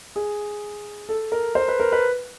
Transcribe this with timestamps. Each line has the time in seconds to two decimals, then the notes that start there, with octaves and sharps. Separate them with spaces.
0.16 G#4
1.09 A4
1.32 A#4
1.55 C5
1.68 B4
1.80 A#4
1.92 B4